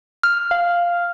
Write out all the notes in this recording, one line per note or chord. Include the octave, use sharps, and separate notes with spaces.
F6
F5